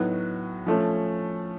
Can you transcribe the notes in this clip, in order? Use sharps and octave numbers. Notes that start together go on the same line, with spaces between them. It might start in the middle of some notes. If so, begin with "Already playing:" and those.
Already playing: A2 F#3 B3 D#4 F#4
F3 A3 C#4